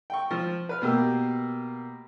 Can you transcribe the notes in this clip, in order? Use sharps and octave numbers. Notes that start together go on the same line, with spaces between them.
G5 C#6
F3
B4 F6
B2 A#3 G4 E6